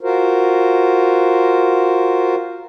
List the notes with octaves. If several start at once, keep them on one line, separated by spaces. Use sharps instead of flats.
F4 F#4 A#4 C5